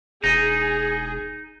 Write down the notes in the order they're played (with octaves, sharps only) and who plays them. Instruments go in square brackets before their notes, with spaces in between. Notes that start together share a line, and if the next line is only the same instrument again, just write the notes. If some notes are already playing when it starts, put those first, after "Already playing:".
[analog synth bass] E1 [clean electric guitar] D#4 [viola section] G#4